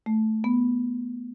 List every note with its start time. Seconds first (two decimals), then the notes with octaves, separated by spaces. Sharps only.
0.06 A3
0.44 B3